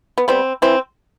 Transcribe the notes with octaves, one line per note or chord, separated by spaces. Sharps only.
B3
G3 B3 C4
E3 C4